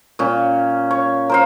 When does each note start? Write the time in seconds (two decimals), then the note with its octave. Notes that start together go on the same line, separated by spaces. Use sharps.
0.19 A#2 C#4
0.91 C#5
1.30 A#4 C5 F5